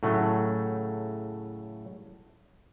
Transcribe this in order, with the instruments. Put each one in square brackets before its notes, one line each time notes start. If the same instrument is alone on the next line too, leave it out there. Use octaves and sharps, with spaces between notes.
[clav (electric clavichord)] A2 C#3 F#3 A3